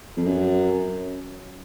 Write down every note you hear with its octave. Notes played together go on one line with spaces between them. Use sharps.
F2
F#2